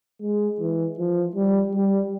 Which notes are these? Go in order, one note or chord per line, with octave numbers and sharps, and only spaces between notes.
G#3
E3
F3
G3
G3